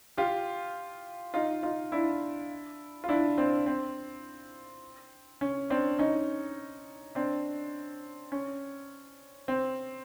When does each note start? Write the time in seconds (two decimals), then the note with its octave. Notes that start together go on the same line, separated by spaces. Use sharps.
0.17 F4 G4
1.34 D#4 F4
1.63 D#4 F4
1.92 D4 E4
3.04 F4
3.09 D4 E4
3.38 C4 D4
3.66 C4
5.41 C#4
5.70 C4 D4
5.99 C#4 D#4
7.15 C4 D4
8.32 C#4
9.48 C4